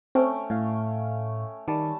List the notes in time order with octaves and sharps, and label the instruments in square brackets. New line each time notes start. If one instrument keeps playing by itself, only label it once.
[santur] A3 C#4 G5 [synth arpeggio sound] C4
[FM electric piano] A2 F5
[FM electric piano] D#3 [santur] G3 A5